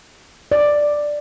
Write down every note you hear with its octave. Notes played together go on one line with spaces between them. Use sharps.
D5